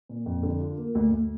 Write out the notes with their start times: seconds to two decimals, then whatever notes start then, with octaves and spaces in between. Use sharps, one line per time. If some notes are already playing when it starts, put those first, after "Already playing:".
0.09 A#2
0.26 F2
0.43 D3
0.60 F4
0.78 A#3
0.95 D2
1.12 D2